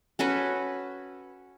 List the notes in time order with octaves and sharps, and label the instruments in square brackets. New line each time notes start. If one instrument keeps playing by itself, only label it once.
[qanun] C#4 F#4 A4 B4